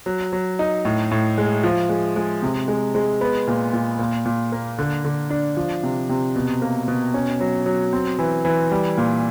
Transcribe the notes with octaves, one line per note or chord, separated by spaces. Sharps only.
F#3
F#3
D#4
A2
A2
G#3
F3
G#3
G#3
C3
G#3
G#3
B3
A#2
A#2
A#2
A#2
A#3
D3
D3
D4
F3
C3
C3
B2
A#3
B2
C#4
F#3
F#3
C4
E3
E3
G3
A#2